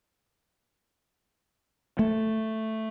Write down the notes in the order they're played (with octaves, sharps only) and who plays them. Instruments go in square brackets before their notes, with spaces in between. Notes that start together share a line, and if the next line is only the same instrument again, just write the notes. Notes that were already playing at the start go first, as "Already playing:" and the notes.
[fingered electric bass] A3